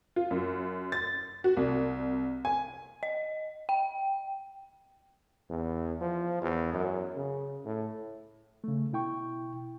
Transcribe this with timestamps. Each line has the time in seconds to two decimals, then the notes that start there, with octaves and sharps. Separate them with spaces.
0.16 F4
0.31 F#2
0.92 A6
1.44 F#4
1.57 C2
2.45 G#5
3.03 D#5
3.69 G5
5.50 E2
6.01 F3
6.42 E2
6.73 F#2
7.16 C#3
7.65 A2
8.64 C#3 A3
8.92 B2 E4 G5 C#6